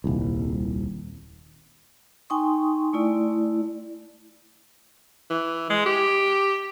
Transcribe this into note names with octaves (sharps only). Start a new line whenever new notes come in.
D#1 C2
D#4 G5 G#5 C6 C#6 D#6
A3 E4 D5
E3
G#3
G4